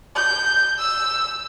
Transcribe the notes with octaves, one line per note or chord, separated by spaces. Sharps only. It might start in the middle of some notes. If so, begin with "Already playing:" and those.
G6
E6